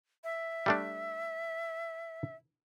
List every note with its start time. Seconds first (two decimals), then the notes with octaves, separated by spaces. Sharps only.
0.24 E5
0.66 G3 A3 D4